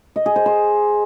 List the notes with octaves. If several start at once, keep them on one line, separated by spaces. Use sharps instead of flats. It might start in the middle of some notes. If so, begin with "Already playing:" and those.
D#5
G#4
C5
C5